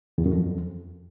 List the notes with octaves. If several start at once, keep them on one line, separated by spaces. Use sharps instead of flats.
E2
F#2
F2